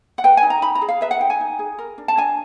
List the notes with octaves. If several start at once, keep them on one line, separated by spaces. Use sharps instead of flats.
F#5
B4 G5
G#5
D#4
A#5
D#4 B5
A#5
G#4
F5
B4 E5
F#5
D#4 G5
G#5
D#4
G#4
A#4
D4
A5
D4 G#5